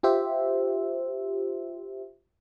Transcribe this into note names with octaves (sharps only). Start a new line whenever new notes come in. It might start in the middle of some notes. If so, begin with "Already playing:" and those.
F4 G4 C5 E5